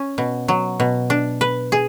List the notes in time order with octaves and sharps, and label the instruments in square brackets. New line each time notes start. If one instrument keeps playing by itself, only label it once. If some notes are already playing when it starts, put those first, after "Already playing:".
Already playing: [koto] C#4
B2
F#3
B2
D4
B4
G#4